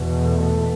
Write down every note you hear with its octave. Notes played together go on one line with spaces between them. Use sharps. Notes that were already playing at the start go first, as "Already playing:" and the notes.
Already playing: E2 B2
A3